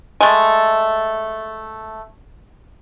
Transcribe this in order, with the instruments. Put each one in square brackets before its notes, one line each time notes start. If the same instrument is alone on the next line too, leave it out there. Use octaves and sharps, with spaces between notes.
[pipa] G#3 A3